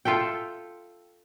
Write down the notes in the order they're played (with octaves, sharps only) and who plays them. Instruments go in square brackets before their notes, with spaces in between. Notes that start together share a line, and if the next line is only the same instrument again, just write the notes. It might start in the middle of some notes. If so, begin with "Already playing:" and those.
[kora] F4 A4 E5 G5